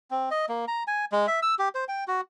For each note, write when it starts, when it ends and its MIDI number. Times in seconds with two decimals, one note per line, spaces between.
0.11 0.29 60
0.31 0.46 75
0.49 0.65 58
0.68 0.83 82
0.87 1.05 80
1.12 1.26 56
1.27 1.40 76
1.42 1.55 88
1.59 1.69 67
1.75 1.84 72
1.89 2.04 79
2.08 2.21 66